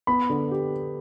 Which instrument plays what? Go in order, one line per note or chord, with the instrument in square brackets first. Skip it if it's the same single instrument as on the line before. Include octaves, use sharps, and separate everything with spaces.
[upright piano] B3 [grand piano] B5
[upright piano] D3
G4